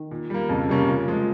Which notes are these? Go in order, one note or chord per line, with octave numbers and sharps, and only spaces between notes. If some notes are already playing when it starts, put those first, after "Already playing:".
Already playing: D#3
A#2
G3 A#3
F2 C#3
C3 G3 A#3 C#4
A#2
F3 G#3